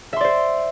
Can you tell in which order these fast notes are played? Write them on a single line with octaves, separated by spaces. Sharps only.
E5 C6 D5 C5